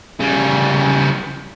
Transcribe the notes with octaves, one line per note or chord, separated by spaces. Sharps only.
C#3 G3